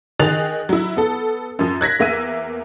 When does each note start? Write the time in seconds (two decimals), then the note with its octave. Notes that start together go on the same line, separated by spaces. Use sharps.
0.20 D#3 G#4 D#5 F#6 A6 F7
0.69 F#3 E4
0.97 B3 A4
1.59 F#2 F3
1.81 F#6 G#6 A#6 B6
1.99 E2 A#3 E5 E6 D#7